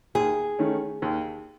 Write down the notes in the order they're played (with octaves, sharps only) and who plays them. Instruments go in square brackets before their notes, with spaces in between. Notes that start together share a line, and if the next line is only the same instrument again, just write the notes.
[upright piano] D#2 [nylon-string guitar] G#4
[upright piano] D#3 A3 C#4
D#2